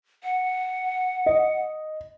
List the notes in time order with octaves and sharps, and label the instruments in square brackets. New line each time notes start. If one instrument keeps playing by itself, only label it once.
[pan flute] F#5
[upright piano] D#5